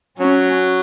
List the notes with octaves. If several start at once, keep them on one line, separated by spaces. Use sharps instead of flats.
F#3 C#4